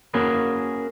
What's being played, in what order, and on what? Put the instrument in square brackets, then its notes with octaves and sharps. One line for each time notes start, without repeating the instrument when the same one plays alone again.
[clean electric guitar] A#3 C#4 F#4 G#4 A#4 B4